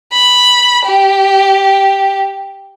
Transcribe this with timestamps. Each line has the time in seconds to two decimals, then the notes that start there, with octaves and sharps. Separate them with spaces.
0.12 B5
0.84 G4